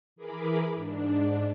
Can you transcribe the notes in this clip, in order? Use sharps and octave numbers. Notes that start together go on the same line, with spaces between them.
E3 G#4 A#4 B5 D6
G#2 D4